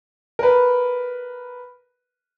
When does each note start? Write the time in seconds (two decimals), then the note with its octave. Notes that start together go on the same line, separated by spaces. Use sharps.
0.39 A#4 B4